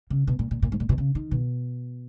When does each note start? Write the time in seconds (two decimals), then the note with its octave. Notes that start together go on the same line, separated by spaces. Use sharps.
0.10 C#3
0.27 B2
0.39 A#2
0.51 A#2
0.62 A#2
0.72 G#2
0.80 A#2
0.89 B2
0.98 C#3
1.15 D#3
1.31 B2